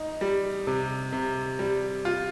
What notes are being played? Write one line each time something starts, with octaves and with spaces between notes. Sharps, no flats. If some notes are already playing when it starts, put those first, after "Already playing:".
Already playing: D#4
G3
C3
C3
G3
F4